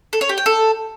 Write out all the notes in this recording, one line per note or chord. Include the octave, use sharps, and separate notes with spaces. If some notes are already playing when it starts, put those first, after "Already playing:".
A4
C#5
G4
G5
A4